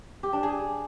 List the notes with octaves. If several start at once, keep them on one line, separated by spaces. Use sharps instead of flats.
G4
D4
G#4